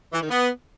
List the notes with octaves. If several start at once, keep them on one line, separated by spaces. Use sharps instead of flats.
E3
D#3
B3